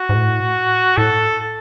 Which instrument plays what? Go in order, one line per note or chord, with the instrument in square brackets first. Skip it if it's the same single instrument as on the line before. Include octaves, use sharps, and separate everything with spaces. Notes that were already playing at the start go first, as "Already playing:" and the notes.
Already playing: [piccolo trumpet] F#4
[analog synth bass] G#2
A2
[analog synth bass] A2 [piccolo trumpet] A4